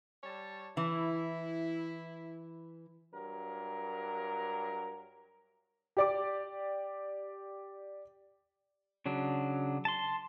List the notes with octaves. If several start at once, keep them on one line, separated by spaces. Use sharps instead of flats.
G3 C#5 A5
E3 E4
G2 F#3 A#4
G4 D5 D6
C#3 F#3 D4
A5 C6